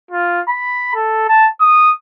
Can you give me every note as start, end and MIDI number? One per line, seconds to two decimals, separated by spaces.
0.11 0.41 65
0.49 0.94 83
0.95 1.24 69
1.29 1.48 81
1.61 1.93 87